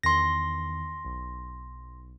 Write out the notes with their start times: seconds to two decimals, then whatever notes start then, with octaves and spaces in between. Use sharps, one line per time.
0.03 E2 D#3 C6 A#6
1.05 B1